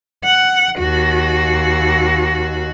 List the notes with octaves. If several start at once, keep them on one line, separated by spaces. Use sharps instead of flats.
F#5
D#2 F#4